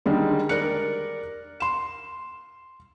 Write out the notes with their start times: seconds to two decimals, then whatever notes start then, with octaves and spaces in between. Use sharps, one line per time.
0.06 D3 D#3 G3 G#3
0.49 A#4 D5 F#6 C#7
1.60 C6 E7